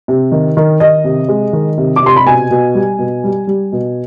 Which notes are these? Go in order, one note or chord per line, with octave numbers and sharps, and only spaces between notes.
C3
D#3
D#3
D#3 D#5
C3
G#3
D#3
C3
D6
C3 C6
B5
B2 G#5
B2
G3
B2
G3
G3
B2